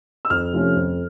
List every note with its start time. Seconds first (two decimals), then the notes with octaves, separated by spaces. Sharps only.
0.25 E6
0.30 F2 F6
0.53 C3 F3 A3 C#4
0.76 F2